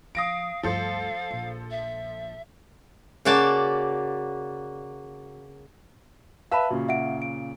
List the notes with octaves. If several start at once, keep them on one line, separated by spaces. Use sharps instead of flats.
F3 F5 D#6 A#6 D7
D2 G2 F3 A4 C5 F5
A#1
E5
C#3 A#3 F#4 D5 A5
B4 E5 F5 A5 B5 E6
A#2 C#3 F#4
E5 F#5 D7
D7